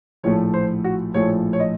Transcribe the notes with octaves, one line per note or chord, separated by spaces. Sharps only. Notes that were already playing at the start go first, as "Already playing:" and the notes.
A#1 A2 F3 A3 C#5
C5
F#4
A#1 A2 F3 A3 C#5
C#5
D#5